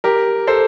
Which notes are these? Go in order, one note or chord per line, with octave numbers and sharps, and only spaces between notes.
G4 A#4
A4 C5